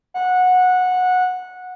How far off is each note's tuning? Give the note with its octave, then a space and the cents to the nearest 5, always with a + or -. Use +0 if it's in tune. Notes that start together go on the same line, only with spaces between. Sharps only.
F#5 -15